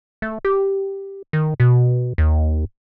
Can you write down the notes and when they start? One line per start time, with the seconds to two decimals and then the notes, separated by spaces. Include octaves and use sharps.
0.22 A3
0.45 G4
1.33 D#3
1.60 B2
2.18 D#2